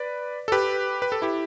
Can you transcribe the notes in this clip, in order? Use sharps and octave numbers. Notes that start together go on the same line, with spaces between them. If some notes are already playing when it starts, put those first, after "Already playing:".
Already playing: B4 D5
A4
G4 B4
B4
A4
E4 G4